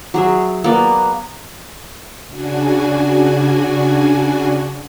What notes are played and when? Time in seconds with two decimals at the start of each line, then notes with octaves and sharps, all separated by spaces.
0.14 F#3 G#4 E5
0.64 A#3 B3 B4 D5
2.28 C#3 D4 F#4 G#5